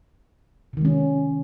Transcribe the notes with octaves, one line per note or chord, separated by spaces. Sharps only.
C3 D#3 G#3 C#4